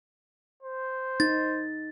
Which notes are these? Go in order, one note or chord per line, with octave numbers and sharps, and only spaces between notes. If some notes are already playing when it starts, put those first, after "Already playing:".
C5
D#4 A6